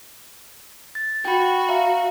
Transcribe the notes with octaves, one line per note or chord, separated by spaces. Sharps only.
A6
F#4 G5 B5
E5 F5 A#5